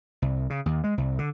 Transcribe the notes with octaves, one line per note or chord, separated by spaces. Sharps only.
C2
C#3
D#2
G#3
C2
D3